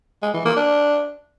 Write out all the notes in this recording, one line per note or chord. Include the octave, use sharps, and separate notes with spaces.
G#3
E3
A#3
D4